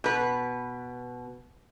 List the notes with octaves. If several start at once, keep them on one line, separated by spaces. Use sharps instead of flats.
B2 B4